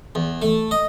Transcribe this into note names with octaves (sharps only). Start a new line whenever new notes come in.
E2
A3
D#5